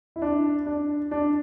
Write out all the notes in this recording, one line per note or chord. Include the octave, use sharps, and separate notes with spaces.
E4
D4
D4
D4